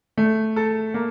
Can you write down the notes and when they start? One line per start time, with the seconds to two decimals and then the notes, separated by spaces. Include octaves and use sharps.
0.18 A3
0.56 A4
0.94 A#3